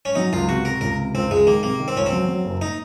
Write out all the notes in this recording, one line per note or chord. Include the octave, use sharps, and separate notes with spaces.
C#4
F#3 D#4
C#2 F4
C3 F#4
C3 A#4
C#2 A#4
C3
C#2 C4
C#2 G#3
D#3 A#3
C3 A#3
D#3
C4
C#2 C#4
C4
F#3
F#3
F#1
D#4